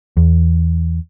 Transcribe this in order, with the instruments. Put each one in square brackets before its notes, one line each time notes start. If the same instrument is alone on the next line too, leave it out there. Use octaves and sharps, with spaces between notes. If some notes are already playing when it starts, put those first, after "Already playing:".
[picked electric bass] E2